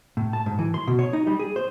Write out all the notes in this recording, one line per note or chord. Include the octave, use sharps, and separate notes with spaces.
A2
A5
G#2
E3
C6
B2
C#5
D#4
G3
G#4
C5